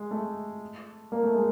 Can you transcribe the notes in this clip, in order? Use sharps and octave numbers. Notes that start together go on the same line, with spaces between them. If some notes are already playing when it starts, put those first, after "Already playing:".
Already playing: G#3
A3
A#3
A3
G#3